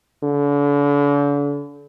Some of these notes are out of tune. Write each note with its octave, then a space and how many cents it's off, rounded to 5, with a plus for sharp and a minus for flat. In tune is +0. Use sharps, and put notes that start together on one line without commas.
D3 -40